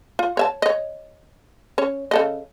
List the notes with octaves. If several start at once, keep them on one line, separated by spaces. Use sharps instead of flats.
F4
C#5 E5 A5
C#5 D#5
C#4 C#5
C#3 A4 D#5